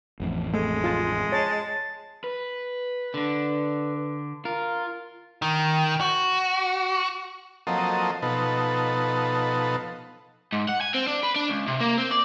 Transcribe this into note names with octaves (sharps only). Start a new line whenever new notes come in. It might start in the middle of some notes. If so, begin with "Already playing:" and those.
A1 F2 A2
G#3 A3
F4 A5
C#5 A5
B4
D3 D4
F4 A#4
D#3
F#4
F3 F#3 A#3 C4 A4 D#5
B2 F3 B3 D#4 A4
G#2
F#5
G#5
C4
D4
B4
D4
C#2
C3
A#3
C4
D5